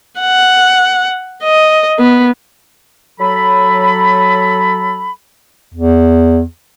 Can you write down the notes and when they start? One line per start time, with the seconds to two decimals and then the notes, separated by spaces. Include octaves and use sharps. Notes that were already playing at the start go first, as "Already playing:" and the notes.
0.21 F#5
1.44 D#5
1.99 B3
3.20 F#3 A4 B5
5.74 E2